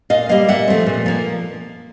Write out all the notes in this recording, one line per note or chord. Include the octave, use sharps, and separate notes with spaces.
A#2 D#5 F5
G3 A#3 D#5 F5
A#2 E5 F#5
F3 A3 C4
A#2
F3 A#3